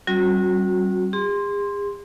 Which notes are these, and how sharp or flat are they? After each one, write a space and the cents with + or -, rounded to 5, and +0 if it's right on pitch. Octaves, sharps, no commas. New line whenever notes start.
G3 -40 C#4 -45 F#4 -30
G#4 -45 C6 +0